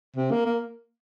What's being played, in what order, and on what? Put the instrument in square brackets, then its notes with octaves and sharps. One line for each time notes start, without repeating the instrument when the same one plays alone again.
[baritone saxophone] C3
A#3
A#3